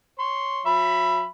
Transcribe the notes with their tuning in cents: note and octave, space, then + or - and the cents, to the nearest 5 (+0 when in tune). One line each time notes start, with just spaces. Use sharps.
C#5 +0 C6 +0
F#3 -40 E5 +25 B5 +0